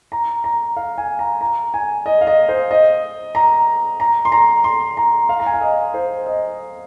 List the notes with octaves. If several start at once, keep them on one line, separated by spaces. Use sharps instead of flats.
A#5
A#5
F5
G#5
A#5
A#5
G#5
D#5
F5
D#5
C5
D#5
A#5
A#5
C6
A#5
C6
A#5
F5
A#5
G#5
F5
D#5
C5
D#5